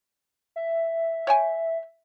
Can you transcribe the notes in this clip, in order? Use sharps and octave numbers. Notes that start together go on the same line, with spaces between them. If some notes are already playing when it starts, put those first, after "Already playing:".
E5
C#5 G5 G#5